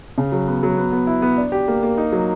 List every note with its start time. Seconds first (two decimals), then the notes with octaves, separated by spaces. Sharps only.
0.18 C#3
0.32 F#3
0.47 B3
0.63 F#3
0.77 B3
0.92 B3
1.07 E4
1.22 B3
1.37 D4
1.52 G4
1.68 A#3
1.83 A#3
1.98 D#4
2.12 F#3